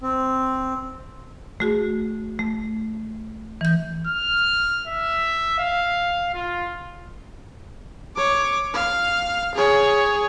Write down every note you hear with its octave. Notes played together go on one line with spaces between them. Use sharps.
C4
A3 F#4 G#4
A3
E3 G6
F6
E5
F5
F4
C#5 D6
F5
G#4 C#5